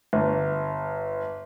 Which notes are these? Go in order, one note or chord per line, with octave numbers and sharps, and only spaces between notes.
G1